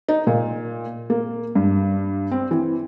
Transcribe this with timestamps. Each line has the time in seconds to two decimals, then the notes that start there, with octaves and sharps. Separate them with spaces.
0.08 D#4
0.27 A#2
1.10 A#3
1.55 G2
2.31 C4
2.51 E3